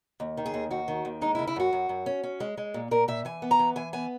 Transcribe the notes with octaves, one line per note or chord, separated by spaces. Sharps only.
D#2
D#3
G#4
D#2
D#2 F#4
D#3
D#2
G#3 D#4
E4
C#3
E4
F#2 F#4
F#2
F#2
C#4
C#4
G#3
G#3
A#2
A#2 A#4
A#2 E5
E3 G#5
B3
A#5
E3
E3 G#5
B3 G#5